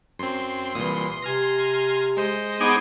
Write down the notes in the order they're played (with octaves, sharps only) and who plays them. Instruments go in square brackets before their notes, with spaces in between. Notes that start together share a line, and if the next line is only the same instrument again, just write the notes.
[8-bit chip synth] F#2 C4 [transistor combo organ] C6
[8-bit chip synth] C2 A#2 D#6 [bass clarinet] E3
[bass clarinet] C3 [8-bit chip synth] G#5 F6 A#6
[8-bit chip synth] G#3 C5 D#5
[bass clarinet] B3 [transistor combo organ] D#4 G#4 D6